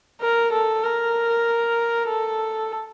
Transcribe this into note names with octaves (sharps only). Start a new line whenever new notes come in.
A#4
A4
A#4
A4